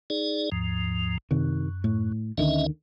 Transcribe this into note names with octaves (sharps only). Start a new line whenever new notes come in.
D#4 G#4 D5
D#2 G#2 F3
F#2 C3 D#3
A2
D2 D3 D#3 C#4 D#5 E5